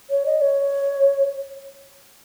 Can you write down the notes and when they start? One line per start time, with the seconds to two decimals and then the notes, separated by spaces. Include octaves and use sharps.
0.10 C#5
0.26 D#5
0.41 C#5